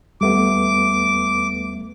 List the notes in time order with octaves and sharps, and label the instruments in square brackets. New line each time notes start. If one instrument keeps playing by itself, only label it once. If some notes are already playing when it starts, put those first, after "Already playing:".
[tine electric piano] D#2 A3 B3 [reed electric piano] G3 [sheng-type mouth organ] D6